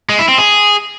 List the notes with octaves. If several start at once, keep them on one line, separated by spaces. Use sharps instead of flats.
G#3
E4
C4
G#4